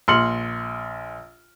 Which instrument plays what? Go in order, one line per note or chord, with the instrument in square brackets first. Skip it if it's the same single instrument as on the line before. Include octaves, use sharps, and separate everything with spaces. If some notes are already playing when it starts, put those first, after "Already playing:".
[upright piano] A#1 C6 F6 C#7 F#7